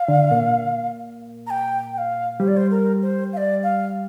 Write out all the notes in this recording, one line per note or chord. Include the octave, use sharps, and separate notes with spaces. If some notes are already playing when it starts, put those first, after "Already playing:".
Already playing: F5
D3
A#2
A#5
G5
G5
F5
G3 C5
D5
C5
A#4
C5
F5
D5
F5